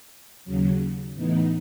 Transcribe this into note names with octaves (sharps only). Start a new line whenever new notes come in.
D#2 C#3 F#3
A2 E3 B3 D#4